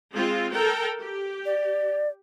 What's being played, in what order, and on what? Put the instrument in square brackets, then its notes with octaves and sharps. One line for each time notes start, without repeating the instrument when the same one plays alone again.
[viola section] G#3 C4 F4
A4 A#4 G5
G4
[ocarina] D5